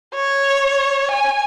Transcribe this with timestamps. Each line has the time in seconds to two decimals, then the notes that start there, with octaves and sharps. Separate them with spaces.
0.15 C#5
1.11 G#5